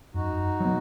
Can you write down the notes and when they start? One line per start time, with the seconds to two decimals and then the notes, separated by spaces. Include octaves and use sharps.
0.14 F#2 D#4 F#4
0.60 F#3 B3